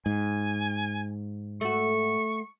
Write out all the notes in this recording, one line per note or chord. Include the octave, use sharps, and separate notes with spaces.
G#2 G#5
A3 F#4 C#6